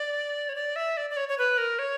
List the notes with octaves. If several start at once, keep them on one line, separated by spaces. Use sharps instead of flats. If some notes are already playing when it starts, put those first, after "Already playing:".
Already playing: D5
C#5
D5
E5
D5
D5
C#5
C#5
B4
A#4
C#5